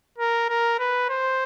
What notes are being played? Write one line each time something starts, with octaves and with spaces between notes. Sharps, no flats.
A#4
A#4
B4
C5